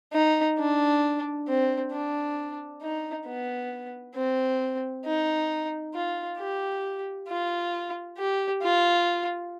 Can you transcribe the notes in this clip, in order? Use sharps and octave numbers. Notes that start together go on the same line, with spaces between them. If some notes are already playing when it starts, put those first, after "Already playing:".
D#4
D4
C4
D4
D#4
B3
C4
D#4
F4
G4
F4
G4
F4